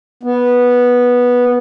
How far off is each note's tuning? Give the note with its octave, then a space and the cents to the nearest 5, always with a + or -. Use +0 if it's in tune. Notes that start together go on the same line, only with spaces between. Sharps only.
B3 -10